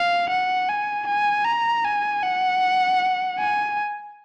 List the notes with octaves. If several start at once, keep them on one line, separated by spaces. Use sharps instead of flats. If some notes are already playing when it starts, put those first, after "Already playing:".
Already playing: F5
F#5
G#5
G#5
A#5
G#5
F#5
G#5